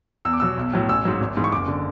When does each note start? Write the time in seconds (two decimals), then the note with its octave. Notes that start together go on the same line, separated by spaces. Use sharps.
0.25 E2 E6
0.33 D6
0.40 B2 F#3 E6
0.57 B1
0.73 A2 F#3
0.89 A1 E6
1.05 G#2 F#3
1.21 G#1
1.37 G#2 E3
1.44 C#6
1.52 F#1 D6
1.68 D3